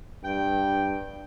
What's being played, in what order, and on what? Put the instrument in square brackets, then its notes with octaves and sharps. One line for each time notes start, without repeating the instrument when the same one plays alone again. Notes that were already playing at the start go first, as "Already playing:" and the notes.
[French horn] G2 [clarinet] G5